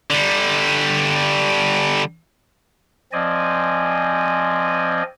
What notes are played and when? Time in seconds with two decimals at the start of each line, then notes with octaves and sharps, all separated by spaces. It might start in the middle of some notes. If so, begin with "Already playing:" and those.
0.10 D3 G3
3.13 F3 C4 D5 D#5 G#5